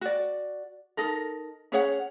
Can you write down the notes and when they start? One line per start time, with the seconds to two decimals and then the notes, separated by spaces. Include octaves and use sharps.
0.01 F#4 D5
0.97 D#4 A4 A#4
1.72 C#4 G#4 C#5 F#5